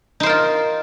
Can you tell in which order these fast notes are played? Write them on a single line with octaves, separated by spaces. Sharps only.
D#4 C5 A#4 F4